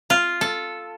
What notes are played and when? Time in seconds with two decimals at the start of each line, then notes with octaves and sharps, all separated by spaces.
0.10 F4
0.41 A4